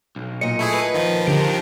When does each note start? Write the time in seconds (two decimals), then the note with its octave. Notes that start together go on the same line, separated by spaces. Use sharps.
0.16 B1
0.41 A#2 D#5 C#7
0.59 A3 E4 G#4
0.74 B4
0.94 D#3 F3
1.28 D3 G4 A#4